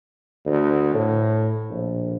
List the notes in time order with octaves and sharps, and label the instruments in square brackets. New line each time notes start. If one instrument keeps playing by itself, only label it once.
[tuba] D2
A2
A#1